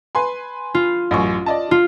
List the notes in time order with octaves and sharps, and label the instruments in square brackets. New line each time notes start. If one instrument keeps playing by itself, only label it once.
[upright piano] B4 G#5 C6
[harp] F4
[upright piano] A1 F#2 C#6
D5 D#5 A5
[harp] F4